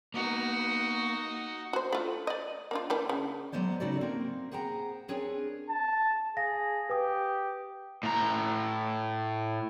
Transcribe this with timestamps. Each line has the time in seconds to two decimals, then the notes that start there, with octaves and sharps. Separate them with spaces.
0.14 A#3 B3 D#4 F#4
1.73 F#4 C5
1.93 A3 F4
2.27 D5 D#5
2.71 A#3 D4 F4
2.90 E3 A#3 D4
3.09 C#3
3.52 F#3 G#3 B3 C5 D5
3.80 C#3 D#4 F#4 A4 D5
4.01 A#3 C4 A#4
4.52 G#4 C5 F#5 G5 A#5
5.08 C4 D4 G#4 A#4 B4 C#5
5.69 A5
6.37 G#4 F5 A#6
6.89 G4 B4 D#6
8.03 A2 A#5